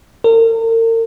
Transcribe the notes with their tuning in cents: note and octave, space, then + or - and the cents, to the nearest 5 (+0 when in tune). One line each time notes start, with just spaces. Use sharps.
A#4 -40